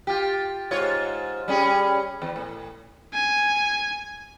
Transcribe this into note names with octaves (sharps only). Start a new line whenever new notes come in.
F4 G4
G#2 F4 C#5
G3 C#4 G#4
E2
A2
G#5